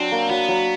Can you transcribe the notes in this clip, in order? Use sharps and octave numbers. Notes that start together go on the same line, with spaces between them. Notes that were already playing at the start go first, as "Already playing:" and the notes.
Already playing: F#3 C4 D4
A#3
F#3 B3
F#3